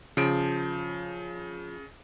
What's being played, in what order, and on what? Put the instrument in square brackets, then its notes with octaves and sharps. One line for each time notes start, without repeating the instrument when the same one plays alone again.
[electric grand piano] C#3 D7 [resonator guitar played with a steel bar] F3